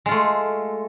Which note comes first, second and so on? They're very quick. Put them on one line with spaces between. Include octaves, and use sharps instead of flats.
G#3 F4 A3